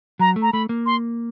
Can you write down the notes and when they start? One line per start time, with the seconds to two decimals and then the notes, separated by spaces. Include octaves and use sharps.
0.19 F#3 A#5
0.36 A3
0.42 A#5
0.53 A3 B5
0.69 A#3
0.86 C6